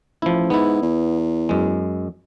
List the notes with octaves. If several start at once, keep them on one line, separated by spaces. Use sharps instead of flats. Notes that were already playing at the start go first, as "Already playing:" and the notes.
A1 F3 E4
G#2 B3 E4
E2
F#2 G#3